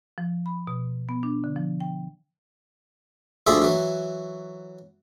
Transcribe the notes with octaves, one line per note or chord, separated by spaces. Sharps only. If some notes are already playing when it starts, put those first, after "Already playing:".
F3
B5
B2
B3
D4
D3
F3
G5
D2 F3 G#4 D5 E5 B5
E3 F#3